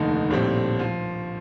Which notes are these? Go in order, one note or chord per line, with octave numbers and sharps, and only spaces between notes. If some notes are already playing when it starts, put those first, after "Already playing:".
Already playing: F1 D#2 D3 A3 D#4
A#1 A2 G3 C4
F3